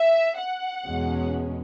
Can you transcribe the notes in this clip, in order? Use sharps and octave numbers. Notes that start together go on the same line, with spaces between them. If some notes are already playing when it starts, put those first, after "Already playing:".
Already playing: E5
F#5
E2 B2 G#3 C#4